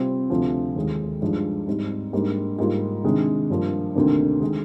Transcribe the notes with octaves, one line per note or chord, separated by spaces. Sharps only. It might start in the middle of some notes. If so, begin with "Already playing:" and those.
Already playing: C3 G3 C4 F4
D2 C3 F3
D#2 D#3 G#3
G2 F3 G#3 D#4
G#2 G3 C4 D#4
G#2 G3 A#3 D4
G#2 G3 A#3 F4
C3 D#3 G#3 D4
G2 F3 A#3
D2 C3 D#3 A#3 D4
D#3 G#3